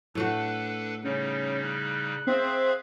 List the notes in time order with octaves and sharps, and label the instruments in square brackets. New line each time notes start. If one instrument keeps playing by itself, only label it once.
[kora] A2 A3 F#4 [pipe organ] D4 A4 B4
[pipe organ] C#3 G3 D#4 [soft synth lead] C#4
[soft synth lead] F#6
[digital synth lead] C4 [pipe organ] G#4 E5 F5